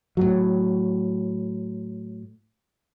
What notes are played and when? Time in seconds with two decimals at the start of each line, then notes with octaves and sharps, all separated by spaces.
0.17 A2 F#3